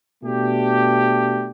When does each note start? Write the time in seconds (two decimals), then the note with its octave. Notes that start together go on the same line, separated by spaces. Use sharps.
0.22 B2 A3 D4 G4